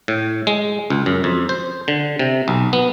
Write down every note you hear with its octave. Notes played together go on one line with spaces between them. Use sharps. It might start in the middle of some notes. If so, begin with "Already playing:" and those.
A2
G#3
C#2
F#2
F2
C5
D3
C3
B1
B3